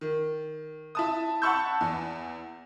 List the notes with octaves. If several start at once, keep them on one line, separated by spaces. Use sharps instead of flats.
D#3
E4 A5 D#6
F#5 A5 B5 C#6 E6 G6
E2